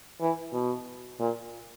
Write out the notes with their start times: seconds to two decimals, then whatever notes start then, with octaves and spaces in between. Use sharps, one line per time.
0.21 E3
0.53 B2
1.19 A#2